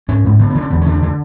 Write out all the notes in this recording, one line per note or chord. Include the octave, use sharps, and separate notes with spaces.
G#2 C#4
G#2
D3 B3
B3
D3
C#4
E2 B3
D3 C#4
D4
D3